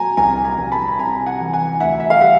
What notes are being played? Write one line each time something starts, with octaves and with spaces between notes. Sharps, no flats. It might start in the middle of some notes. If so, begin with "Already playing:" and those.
Already playing: A#2 F#3 G#5 A#5
C2 G#5 A#5
G#5 A#5
C2
A5 B5
B5
C3 G#5 A#5
F#5 G#5
E3
F#5 G#5
D2 E5 F#5
E5
F5
G3 E5 F#5